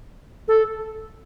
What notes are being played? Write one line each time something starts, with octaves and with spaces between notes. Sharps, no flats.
A4